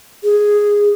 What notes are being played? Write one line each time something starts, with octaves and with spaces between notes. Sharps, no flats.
G#4